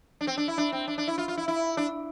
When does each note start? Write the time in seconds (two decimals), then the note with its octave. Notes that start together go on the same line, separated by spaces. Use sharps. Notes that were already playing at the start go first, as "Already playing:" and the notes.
0.21 D4
0.27 C4
0.37 D4
0.48 E4
0.58 D4
0.72 C4
0.88 D4
0.98 D4
1.08 E4
1.18 F4
1.28 F4
1.38 E4
1.48 E4
1.77 D4